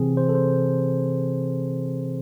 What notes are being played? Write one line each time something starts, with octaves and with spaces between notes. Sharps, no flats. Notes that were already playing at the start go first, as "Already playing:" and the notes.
Already playing: C3 E3 C4 G#4
C5
A4
C5